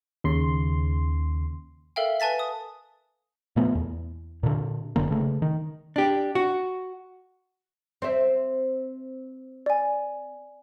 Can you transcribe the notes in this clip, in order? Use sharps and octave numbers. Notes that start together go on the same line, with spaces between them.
D#2 C#3 C6
A4 A#4 E5 F5 G5
B4 G#5 A5 A6 B6
D#6
A#2 F3 A3 B3
E2
A#2 D3
F#1 D3 A#3
C#3 A3
D#3
D4 G4
F#4
C4 E5
D5 G#5